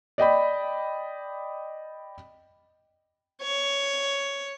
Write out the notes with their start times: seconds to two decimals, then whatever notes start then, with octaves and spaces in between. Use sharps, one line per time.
0.18 D5 D#5 G5 B5
3.42 C#5